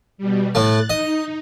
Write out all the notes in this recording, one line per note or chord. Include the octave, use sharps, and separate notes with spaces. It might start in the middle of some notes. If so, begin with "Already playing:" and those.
B2 G3
A2 A3 F#6 A6
D#4 D#5